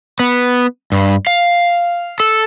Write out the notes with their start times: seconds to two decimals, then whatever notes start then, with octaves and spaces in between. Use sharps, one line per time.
0.20 B3
0.92 G2
1.27 F5
2.20 A4